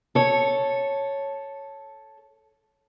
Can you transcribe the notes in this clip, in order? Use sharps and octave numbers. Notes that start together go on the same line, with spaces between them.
A4 C#5